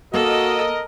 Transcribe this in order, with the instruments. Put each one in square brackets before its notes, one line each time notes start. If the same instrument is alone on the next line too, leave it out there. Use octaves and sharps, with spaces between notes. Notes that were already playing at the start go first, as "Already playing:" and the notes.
[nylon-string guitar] A#3 [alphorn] F#4 [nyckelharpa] A4 [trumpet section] A#4 D#5